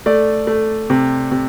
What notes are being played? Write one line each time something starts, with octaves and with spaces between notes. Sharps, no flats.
A3 D5
A3
C3
C3